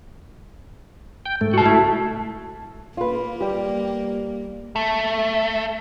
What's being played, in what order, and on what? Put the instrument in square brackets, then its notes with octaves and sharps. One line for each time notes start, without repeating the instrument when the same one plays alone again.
[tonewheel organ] G5
G#2 A3
[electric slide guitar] F#4 A5
[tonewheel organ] A3 E4
[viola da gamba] A#3 [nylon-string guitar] F4 B4
[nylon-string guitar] G3 G4
[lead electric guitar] A3